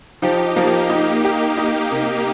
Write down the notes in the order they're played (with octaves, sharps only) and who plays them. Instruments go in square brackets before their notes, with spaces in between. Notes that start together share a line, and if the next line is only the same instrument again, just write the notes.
[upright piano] F3 [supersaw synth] D#4 G4
[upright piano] F3 [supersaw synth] A#3 D#4
[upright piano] D#4
G4
D#4
C3